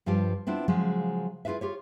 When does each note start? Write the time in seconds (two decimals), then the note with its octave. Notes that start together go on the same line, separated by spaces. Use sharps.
0.06 G2 F3 F4 G4
0.47 B3 C4 D4 E4 F4
0.68 C#3 F3 F#3 G#3
1.45 E4 F4 G#4 B4 E5
1.61 F4 G4 C#5